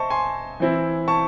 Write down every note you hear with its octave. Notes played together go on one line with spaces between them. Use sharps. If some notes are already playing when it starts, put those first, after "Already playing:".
Already playing: C5 D#5 E5 A5 C#6
G#5 C6
E3 C4 E4
A5 C#6